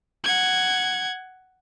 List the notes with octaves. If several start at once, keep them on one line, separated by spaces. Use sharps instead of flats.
F#5 G#6